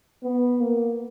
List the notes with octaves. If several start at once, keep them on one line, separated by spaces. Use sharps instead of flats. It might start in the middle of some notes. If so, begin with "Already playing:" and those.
B3
A#3